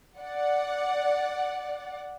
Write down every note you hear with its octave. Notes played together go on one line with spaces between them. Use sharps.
D5 F#5